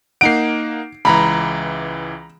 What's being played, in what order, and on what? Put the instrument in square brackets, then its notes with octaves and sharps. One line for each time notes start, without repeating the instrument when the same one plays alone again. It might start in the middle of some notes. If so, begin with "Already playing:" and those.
[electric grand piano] A#3 D#4 F#5 [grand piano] C7 D7
[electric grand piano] C#2 E3 [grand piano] A#5 B5